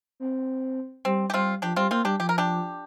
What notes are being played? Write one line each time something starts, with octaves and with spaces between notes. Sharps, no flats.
C4
G3 C4
G4
G3 C4 F4
F3 D4 G4
G3 C4 F4
A#3 C4 F4
G3 D4 G4
F3 G4
A#4
D4 G4